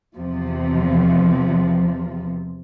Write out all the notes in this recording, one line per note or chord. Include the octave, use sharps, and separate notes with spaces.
E2 C3 F3